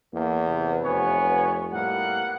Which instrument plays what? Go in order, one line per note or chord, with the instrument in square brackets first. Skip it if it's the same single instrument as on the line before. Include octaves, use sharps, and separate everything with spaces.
[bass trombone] E2 [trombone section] A#3
[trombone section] C3 B4
[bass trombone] F1 [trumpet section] B3 C#5 G#5
[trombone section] A2 G3 [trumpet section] A#3 B3 F#5